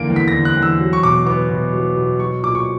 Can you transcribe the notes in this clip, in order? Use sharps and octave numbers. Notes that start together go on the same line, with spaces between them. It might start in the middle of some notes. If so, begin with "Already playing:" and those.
Already playing: E2 D3 A#3 D7
E2
B6
A#6
D3
F#6
E2
E6
F#3
C#6
B2 D6
B3 D6
B2
F#3
B2
F#3 C#6
A#2 D6
C#6